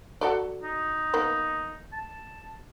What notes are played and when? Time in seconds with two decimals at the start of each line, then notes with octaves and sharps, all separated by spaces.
0.21 F#4 A4 D5
0.63 D#4
1.14 D#3 A#3 B3
1.92 A5